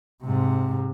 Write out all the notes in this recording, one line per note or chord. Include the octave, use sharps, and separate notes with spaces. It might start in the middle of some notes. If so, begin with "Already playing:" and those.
G#2 C3